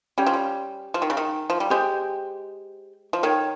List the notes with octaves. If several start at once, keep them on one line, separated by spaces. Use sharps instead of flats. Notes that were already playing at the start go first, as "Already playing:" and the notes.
G3 C#4 G4 C#5 G5
F3
G3
F3
D#3
C#3
D#3
F3
G3
G#3 G4 C5 G5
F3
D#3 A#4 C#5 G5